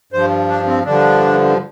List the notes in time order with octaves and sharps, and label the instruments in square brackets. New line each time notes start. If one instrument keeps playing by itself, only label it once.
[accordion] G2 F3 C5
D4
C4
G2 D3 F3 D4